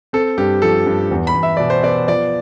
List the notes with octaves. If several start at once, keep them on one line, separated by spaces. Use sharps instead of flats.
C4 A4
G2 G4
F3 A4
G2
E2
B5
E2
E5
B2 D5
C5
B3 D5
F3 D5